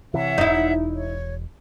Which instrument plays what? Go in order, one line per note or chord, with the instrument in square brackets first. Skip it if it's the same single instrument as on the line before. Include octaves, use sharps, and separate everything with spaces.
[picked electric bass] C3 E3 [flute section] C#5 E5 F#5
[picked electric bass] E1 [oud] D#4 E4
[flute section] C#5